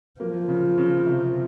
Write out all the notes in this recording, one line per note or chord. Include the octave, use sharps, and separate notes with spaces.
F3 A#3
C#3
C#3
C3